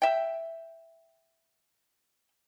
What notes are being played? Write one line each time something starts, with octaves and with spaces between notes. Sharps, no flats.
E5 G5